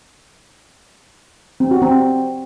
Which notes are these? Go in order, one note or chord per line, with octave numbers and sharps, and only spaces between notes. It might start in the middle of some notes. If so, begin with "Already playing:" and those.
C4
F#4
C4